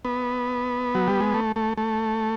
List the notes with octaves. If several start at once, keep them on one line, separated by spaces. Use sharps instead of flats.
B3
F#3
G3
G#3
A3
A3
A3